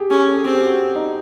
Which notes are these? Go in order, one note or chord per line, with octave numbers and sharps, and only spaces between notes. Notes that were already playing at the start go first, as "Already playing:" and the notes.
Already playing: G4 G#4
C#4 G#4
A4
G#4
C4 G4
G4
F#4
D#4